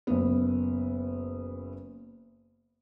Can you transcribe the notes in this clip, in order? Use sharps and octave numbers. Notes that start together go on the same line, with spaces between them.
F#1 B3